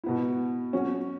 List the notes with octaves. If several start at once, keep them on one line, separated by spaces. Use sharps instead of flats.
B2 B3 E4
F#3 C#4 F#4